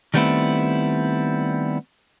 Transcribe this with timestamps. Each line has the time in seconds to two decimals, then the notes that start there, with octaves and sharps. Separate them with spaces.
0.14 D#3 G3 A3 B3 C4 E4